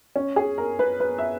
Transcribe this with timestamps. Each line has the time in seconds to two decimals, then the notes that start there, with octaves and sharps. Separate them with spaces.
0.16 C#4
0.36 G#4
0.58 A#4
0.79 B4
1.00 B4
1.18 E5